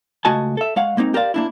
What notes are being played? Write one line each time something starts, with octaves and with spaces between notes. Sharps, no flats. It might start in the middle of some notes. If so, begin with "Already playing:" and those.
C#2 A3 F#4 D#5 G#5 A5
A4 E5
G#3 C#5 F5 F#5
G#3 A#3 C4 D#4
G4 A#4 C5 D5 F5
A#3 D4 E4